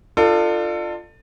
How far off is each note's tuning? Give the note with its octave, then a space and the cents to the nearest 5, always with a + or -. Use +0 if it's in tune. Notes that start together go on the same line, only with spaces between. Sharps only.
D4 +40 F4 +0 A4 +25